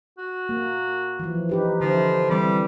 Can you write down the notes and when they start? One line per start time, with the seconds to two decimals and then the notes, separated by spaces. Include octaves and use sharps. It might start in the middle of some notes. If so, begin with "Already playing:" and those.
0.18 F#4
0.49 A#3
1.19 E3 F3
1.49 D#4 G4 B4
1.81 D3 F3 E4
2.30 E3 G3 C4